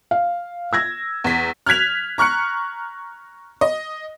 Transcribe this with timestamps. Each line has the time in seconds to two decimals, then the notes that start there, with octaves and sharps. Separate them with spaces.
0.11 F5
0.73 E6 G#6 A#6
1.24 E2 B6
1.66 F6 F#6 G#6 B6 F7
2.18 A#5 C#6 F6 F#6 C#7
3.61 D#5